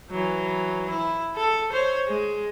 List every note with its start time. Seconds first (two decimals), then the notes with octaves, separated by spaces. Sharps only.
0.10 E3 F#3
0.90 E4
1.36 A4
1.73 C5 C#5
2.08 G#3